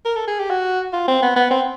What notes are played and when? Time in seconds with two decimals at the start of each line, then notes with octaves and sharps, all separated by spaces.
0.05 A#4
0.16 A4
0.27 G#4
0.39 G4
0.50 F#4
0.93 F4
1.08 C4
1.22 B3
1.36 B3
1.51 C4